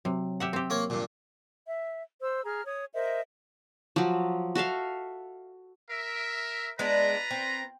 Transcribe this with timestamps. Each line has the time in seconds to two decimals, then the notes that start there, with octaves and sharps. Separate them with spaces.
0.05 C3 F#3
0.40 G4 E5 F#5
0.53 C4 G4
0.70 A#3 C#5
0.90 G2 A#2
1.66 E5
2.20 C5 E6
2.44 G#4 A#5 F6
2.64 C#5 D#6
2.94 A#4 C5 D#5 E5
3.96 F3 F#3
4.55 F#4 A4 E5 F5
5.90 A#4 E5
6.79 G#3 B3 D4 F4 B4 A#5
7.31 C4